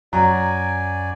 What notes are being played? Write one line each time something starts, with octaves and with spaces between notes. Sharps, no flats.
F#2 F#3 D5 G#5 A#5